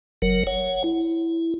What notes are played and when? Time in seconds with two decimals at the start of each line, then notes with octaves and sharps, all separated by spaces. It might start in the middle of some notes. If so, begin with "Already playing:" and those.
0.22 F#1 F#3 A#4
0.47 C#5 F#5
0.84 E4